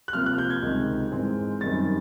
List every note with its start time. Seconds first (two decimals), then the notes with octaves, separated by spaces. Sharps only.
0.08 F#6
0.13 C3 F3 A#3 F6
0.26 F#6
0.38 G6
0.50 G#6
0.63 C#2 C3 D#3
1.12 G#2 E3 G#3 C4
1.61 F#2 D#3 G3 C4 A6